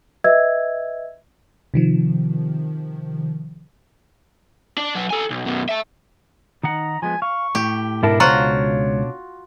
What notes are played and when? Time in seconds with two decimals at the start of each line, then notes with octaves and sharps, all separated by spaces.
0.24 B4 D#5 E5 E6 G#6
1.74 C3 D#3 F3
4.77 D4 D5
4.95 F#3 B4
5.10 A4 G#5
5.30 B1
5.46 F#2 B2
5.69 E5 A5
6.63 D#3 D#4 F#5 A#5
7.02 F3 G#3 B3 G#5
7.22 F5 C#6
7.55 A2 G4
8.03 G#2 B2 D4 E4 A4 A#4 A5
8.20 C#2 F4 F#4 C5 C#5 F#5 A#5